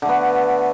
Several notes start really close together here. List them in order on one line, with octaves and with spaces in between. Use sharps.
D3 A3 B3